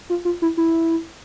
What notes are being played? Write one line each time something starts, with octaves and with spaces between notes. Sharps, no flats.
F4
F4
E4
E4